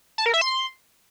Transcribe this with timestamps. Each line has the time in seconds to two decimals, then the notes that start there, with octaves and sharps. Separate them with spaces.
0.18 A5
0.26 A#4
0.34 E5
0.41 C6